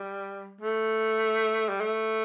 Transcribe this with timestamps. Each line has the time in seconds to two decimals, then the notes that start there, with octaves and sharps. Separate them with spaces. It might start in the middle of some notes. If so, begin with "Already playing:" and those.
Already playing: G3
0.61 A3
1.69 G3
1.81 A3